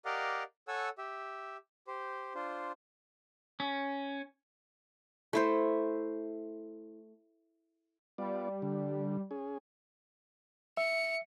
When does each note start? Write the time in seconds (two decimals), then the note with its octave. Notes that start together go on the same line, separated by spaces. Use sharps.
0.05 G4 A#4 D5 D#5 F5 F#5
0.68 A4 C#5 F#5 G#5 E6
0.98 G4 E5
1.87 G4 C5
2.35 D4 F4 C5
3.60 C#4
5.33 A3 E4 C5
8.18 G3 B3 F4 D5
8.62 D3
9.31 C#4 G#4
10.77 E5 C#7